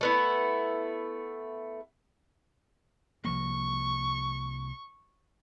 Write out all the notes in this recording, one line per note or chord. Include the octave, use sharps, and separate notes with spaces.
A3 B3 E4
C2 F3 A#3 C#6